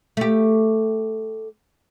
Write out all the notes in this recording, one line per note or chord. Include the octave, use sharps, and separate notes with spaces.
A3 G4